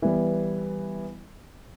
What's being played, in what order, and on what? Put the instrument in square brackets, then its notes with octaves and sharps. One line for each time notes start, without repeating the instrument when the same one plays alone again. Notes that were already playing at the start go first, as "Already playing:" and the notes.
[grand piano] E3 G3 B3